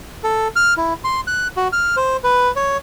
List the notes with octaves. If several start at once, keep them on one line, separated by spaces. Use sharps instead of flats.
A4
F6
E4
C6
F#6
F#4
F6
C5
B4
C#5